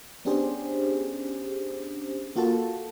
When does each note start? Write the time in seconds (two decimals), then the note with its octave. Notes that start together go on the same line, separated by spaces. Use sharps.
0.25 B3 C#4 D4 G4 G#4 C5
2.36 A#3 F4 F#4 A4 A5